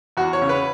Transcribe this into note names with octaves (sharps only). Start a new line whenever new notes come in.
E2 F#4
C#5
C#3
B4